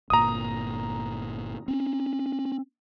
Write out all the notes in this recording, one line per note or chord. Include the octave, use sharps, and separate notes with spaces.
G1 A#2 A#5 D#6
C4 C#4